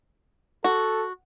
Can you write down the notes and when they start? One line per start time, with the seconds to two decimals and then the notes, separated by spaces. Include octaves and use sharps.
0.64 F#4 A4